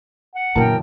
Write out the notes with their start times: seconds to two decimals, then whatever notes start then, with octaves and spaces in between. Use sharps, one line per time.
0.35 F#5
0.55 F#2 A#2 D3 E3 A#4 G5 A5